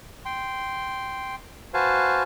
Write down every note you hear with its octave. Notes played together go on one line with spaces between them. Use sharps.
G5 C6
F#4 B4 C5 F5 G#5 A5